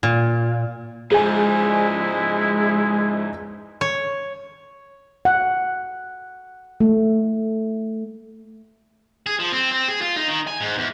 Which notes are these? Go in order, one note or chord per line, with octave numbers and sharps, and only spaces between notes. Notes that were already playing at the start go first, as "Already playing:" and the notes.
A#2
G#2 F3 G#3 E4 G#4 G#5
C#5
F#5
A3
G#4
F3
C4
C4
G#4
F4
D#4
D#3
G#5
G#2
E2